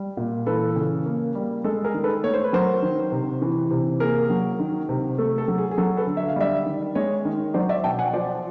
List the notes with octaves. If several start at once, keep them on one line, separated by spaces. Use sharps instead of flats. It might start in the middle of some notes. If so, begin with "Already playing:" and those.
Already playing: G3
A#2
E3 A4 B4
C#3
A#3
G3
G#3 A4
G#4 A#4
D#3
A4 B4
A3 C#5
C5
B4
F#3 A#4 C5
D#3
C3
E3
C3
A#3 G#4 A#4
F#3
D#3
C3
A3 A4
A4
F#3
G#4
G#4
F#3 A4
A4 B4
D3
E5
F5
G3 D5 E5
D#3
G#3 C#5 D#5
D#3
F#3 C5 D5
D5 E5
B2 G5 A5
F#5 G#5
F3 C5 D5